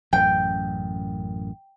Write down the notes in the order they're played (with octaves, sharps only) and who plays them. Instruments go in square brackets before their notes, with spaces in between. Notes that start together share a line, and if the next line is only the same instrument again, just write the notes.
[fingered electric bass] A1 F#2 [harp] G5